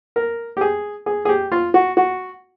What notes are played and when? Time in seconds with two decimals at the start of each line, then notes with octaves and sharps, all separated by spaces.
0.16 A#4
0.57 G4
0.61 G#4
1.06 G#4
1.25 G#4
1.29 G4
1.52 F4
1.74 F#4
1.97 F#4